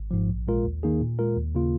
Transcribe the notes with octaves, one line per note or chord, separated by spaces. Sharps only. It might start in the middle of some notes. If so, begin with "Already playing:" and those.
Already playing: G#1
G#2 F3
A#1
A#2 G#3 F4 A#4
D#2
D#3 A#3 D#4 G#4
A#2
G#3 F4 A#4
D#2
C#3 A#3 F4